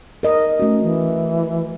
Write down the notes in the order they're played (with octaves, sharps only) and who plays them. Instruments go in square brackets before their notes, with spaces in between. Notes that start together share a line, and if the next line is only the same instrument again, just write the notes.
[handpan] A#4 D#5
[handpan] A3 F#4 [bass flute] C#4
[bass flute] E3